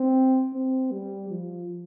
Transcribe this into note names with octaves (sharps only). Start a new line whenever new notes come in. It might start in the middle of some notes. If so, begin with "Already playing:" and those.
Already playing: C4
C4
G3
F3